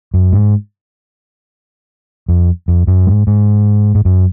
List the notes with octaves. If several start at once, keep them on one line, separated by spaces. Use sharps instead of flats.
F#2
G#2
F2
F2
F#2
G#2
G#2
G#2
F#2